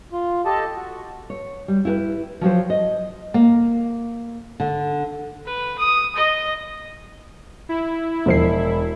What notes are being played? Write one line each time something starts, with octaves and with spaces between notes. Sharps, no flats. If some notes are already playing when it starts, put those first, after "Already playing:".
F4
G4 A4 D#5 A5
F#4
C#5
G3
E4 G4 A#4 B4
F3 F#3 G4 C5
D#5
A#3
D3
B4
D#6
D#5
E4
E1 D#2 F3 C7